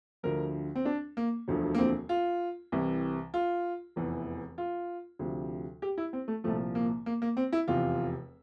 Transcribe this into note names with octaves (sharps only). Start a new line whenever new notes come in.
D2 D3 F3 A#4
C4
D4
A#3
E1 D2 D3 F3
A#3
C4
F4
C2 C3 E3
F4
F1 E2 E3
F4
D2 C3 F3
G4
E4
C4
A3
C2 A#2 F3 A3
A#3
A#3
A#3
C4
E4
F1 E2 C3 F4